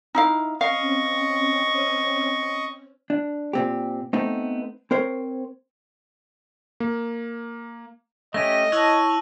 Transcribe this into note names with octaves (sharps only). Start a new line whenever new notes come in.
D#4 E4 F5
C4 C#4 D#5 F5 C#6
D4
A#2 C4 G4
A3 B3 C4 D#4
C4 A#4 C5 C#5
A#3
A3 C#4 G4 D#5 A#6 D#7
E4 C#5 A5 E6 F#6 F#7